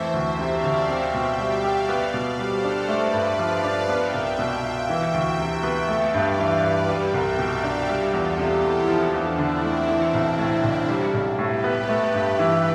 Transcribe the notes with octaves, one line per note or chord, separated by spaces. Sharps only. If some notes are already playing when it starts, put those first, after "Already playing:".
Already playing: F2 E3 A3 C5 E5
D2
C3 D5 F5
D2
C4 E5 G5
B2
G3 D5 F5
G4
B3
B2
G3 A4 C5
D4
A3 B4 D5
G2
F3 D5 F5
D4
B3 E5 G5
C2
B2
F4
E3 E5 G5
D2
C3 E5 G5
B3
A3 D5 F5
G2
E3 B4 D5
G2
G3 E5 G5
C2
B2 D5 F5
D4
G3 F4 A4
E2
C3 E4 G4
E2
F3 D4
E2
D3 C4 E4
A3
E3 C4 E4
B1
A2 D4
B1
G3
B1
A2 G4 B4
B3
A3
G2
E3